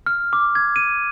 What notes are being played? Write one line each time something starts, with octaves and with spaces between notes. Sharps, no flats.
F6
D6
G#6
D#7